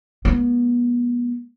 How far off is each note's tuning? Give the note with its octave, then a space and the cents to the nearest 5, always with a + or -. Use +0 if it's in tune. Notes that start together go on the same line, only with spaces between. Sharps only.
G#3 +20 B3 -35